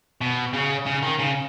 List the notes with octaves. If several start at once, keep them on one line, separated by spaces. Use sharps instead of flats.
B2
C#3
C#3
D#3
C#3